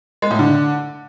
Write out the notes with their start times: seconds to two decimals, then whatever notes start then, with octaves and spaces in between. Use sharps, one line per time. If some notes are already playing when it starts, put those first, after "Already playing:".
0.22 G#3
0.31 A2
0.39 D3